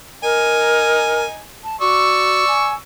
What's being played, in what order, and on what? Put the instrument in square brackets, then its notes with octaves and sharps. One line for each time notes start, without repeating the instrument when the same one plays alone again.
[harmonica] D#4 G#5 [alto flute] A#4
[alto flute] A5
[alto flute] F#4 [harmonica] D5 C#6 E6
[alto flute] G#5